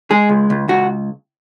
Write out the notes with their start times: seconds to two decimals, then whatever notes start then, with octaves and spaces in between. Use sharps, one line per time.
0.11 G#3 G#4
0.29 C#2
0.50 C#2
0.68 C#2 F#4